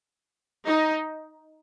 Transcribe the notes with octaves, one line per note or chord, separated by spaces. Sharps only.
D#4